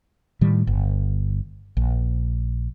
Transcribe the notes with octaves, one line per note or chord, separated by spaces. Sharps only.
A2 D#3 G3
G1
A#1